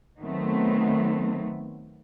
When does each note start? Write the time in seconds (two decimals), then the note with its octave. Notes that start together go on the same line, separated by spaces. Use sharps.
0.20 D#3 F#3 A3 B3 C4